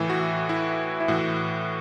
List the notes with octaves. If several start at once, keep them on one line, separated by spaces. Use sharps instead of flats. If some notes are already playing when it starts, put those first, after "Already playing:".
Already playing: A2 E3
F#4
E4
E4
A2 E3 F#4